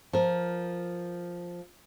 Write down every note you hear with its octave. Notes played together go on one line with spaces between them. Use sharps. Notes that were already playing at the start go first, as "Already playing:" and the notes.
F3 A#4